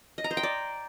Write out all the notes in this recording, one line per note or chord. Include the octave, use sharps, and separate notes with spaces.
D#5
A#5
C5
G5
D5